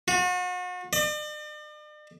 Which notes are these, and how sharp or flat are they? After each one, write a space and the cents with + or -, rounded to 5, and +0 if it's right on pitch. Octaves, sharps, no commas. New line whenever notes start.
F#4 -40
D5 +45